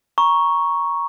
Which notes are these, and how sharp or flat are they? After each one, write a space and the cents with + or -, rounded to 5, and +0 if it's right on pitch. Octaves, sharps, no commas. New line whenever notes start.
A#5 +15 C#6 +0